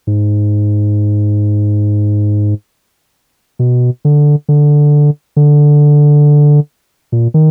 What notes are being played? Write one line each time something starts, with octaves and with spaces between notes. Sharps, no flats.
G#2
B2
D3
D3
D3
A#2
D#3